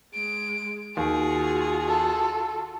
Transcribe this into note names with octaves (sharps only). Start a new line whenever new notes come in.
G#3 D7
D#2 F4 F#4 G#4
A4